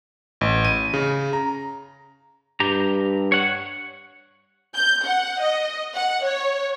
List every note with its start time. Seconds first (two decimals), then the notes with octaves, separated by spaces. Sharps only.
0.41 A1
0.65 D#7
0.94 C#3
1.33 A#5
2.60 G2 G4 A#5
3.32 C#5 F#5
4.74 G6
5.03 F#5
5.42 D#5
5.94 F#5
6.25 C#5